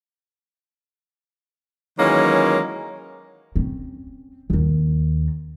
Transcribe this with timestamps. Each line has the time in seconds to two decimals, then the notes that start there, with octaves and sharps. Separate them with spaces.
1.98 D#3 E3 F#3 G#3 A#3 C#4
3.56 C4 C#4
4.50 D#2 D#3